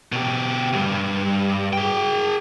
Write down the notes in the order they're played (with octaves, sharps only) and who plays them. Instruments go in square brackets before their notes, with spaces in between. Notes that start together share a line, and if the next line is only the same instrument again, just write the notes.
[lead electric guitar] B2 G4
C#2 G2
G#4 G5